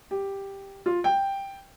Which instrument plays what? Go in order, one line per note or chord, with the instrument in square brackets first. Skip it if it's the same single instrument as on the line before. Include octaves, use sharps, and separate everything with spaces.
[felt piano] G4
F4
G5